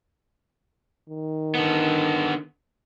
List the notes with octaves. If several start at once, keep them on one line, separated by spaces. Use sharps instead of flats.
D#3
D3 B3